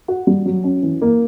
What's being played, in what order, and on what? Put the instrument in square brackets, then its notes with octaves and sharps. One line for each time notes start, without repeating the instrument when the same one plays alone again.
[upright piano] F#4
G3
F#3
C#4
E3
A#3